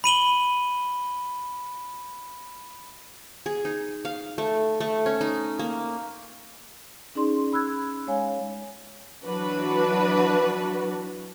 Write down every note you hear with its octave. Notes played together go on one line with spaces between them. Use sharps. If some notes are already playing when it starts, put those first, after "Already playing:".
B5 D#7 F#7 G7
G#4
D#4
F5
A3
A3
C#4
D#4
A#3
C#4 D#4 G#4 D5 C6
B5 E6 F#6 G#6
G#3 C#5 F5 G#5
E3 F#3 D4 F#4 B4